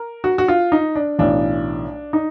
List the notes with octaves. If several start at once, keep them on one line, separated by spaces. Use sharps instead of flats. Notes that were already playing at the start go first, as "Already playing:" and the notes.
Already playing: A#4
F#4
F#4
F4
D#4
D4
B1 A2 E3 D4
D#4